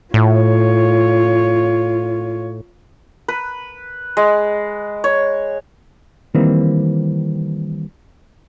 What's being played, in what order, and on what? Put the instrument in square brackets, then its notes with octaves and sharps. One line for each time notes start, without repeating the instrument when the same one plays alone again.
[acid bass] A2 [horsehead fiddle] F4 C#5
[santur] B4
G#3
C#5
[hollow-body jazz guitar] D#3 E3 G3 A#3 C4